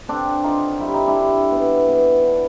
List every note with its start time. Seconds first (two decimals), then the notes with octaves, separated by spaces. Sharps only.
0.08 D3 C4 D4
0.44 D3 D#4 F4
0.80 G3 E4
0.94 D#4
1.07 D4 E4
1.16 G3
1.52 B3
1.88 B3
2.23 D3